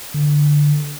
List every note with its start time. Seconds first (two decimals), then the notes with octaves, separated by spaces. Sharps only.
0.14 D3